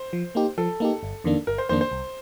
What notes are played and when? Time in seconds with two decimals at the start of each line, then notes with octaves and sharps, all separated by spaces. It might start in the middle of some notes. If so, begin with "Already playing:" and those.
Already playing: C5
0.13 F3
0.35 A#3 D#4 G4
0.58 F3 A4
0.80 A#3 D#4 G4
1.03 G1
1.24 F2 D#3 A#3 D4
1.47 G1 A#4
1.58 C5
1.69 F2 D#3 A#3 D4 C5
1.81 C5
1.91 C2